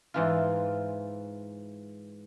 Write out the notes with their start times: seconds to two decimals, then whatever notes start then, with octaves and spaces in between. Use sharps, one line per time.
0.14 G#2 E3 F4